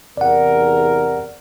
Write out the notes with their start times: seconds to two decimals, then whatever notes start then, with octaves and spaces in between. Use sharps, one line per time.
0.17 E2 C3 A#4 D5 F#5